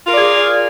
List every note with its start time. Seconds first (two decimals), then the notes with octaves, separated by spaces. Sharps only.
0.04 F4
0.08 A#4
0.13 D5
0.17 G#4